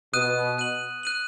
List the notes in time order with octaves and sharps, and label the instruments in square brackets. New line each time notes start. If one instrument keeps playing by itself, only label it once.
[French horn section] B2 [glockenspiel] D#6 F#6 D#7
[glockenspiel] F#6 D#7 F#7
F#6 D#7 F#7